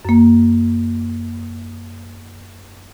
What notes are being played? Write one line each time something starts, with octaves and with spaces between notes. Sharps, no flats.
F#2 A#3